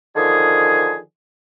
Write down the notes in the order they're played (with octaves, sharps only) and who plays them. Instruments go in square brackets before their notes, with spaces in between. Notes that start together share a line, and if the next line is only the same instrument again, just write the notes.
[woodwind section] D3 D#3 F3 G#4